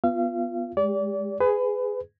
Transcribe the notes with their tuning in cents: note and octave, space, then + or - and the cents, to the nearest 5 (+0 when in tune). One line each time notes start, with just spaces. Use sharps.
B3 +0 F4 +0 F5 -35
G#3 +0 G4 +30 D5 -30
G#4 +0 B4 +25